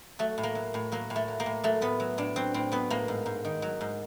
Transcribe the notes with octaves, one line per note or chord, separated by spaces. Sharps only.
F#3 A3
A2
A#3
F#3
A2
F#3 A#3
A2
A3
F#3
A#3
A2
F#3 A3
A2 B3
F#3
A2 D4
F#3 C4
A2 C4
F#3 B3
A2 A#3
G#2
G#2
D#3
F#3
G#2